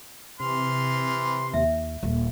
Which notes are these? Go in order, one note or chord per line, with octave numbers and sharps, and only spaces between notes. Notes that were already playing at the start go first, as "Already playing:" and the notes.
C3 E3 C6 F6
D#2 E5
D#1 A#3